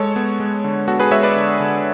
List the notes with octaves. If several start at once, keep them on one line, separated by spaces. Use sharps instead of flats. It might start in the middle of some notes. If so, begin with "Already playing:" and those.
Already playing: G#3 A4 C#5
B3
G#3
D3
B3 F#4 A4
G#4 B4
G#3 C#5 E5
B4 D5
D3
D3